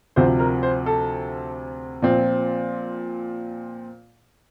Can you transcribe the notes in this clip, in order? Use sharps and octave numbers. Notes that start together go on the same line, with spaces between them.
D2 C3 F3 C5
A#4
C5
A4
A#2 F3 C4